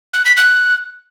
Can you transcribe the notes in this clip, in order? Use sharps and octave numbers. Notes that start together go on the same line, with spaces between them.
F#6
B6
F#6